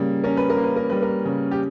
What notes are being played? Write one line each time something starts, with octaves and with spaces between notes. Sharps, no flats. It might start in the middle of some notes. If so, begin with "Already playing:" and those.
Already playing: C#3 G3 A#3
C#4 A#4
B4
A#4
A#3
B4
A#4
G3 B4
A#4
C#3
G4